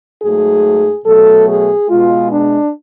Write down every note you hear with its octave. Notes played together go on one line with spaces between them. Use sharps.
G#2 F#3 A3 G#4
B2 F#3 A3 A4
G#4
B2 G#3 F4
D4